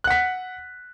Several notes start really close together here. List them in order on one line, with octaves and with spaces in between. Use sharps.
F#6 F#5 B6